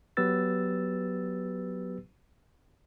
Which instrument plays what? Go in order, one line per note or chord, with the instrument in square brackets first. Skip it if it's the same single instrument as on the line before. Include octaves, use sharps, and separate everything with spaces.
[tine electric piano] F#3 B3 G4 B4 E6 A6